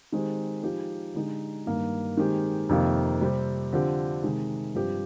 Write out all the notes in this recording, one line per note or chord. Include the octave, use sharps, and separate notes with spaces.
D#3 G#3 C4 G4
F3 G#3 D#4 G4
D3 G#3 D#4 G4
G2 D#3 A#3
D#3 G#3 C4 G4
F2 C3 D#3 A#3 F4
C3 G3 C4 G4
D3 F3 C4 G4
C3 D#3 G#3
G2 F3 C4 G4